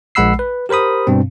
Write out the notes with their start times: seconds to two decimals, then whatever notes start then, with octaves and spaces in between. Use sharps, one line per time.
0.15 A#1 G#3 F#5 B5 E6 C7
0.39 B4
0.69 G4 A#4 C5 B5 D#6
1.07 G2 B2 C4